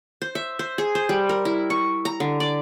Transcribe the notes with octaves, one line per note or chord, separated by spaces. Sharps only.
C5
E5
C5
G#4
C5
G3
A#4
E4
C#6
A#5
D3
D5